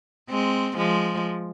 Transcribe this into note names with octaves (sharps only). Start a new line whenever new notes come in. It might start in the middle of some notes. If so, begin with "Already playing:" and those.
G#3 C4
F3 G#3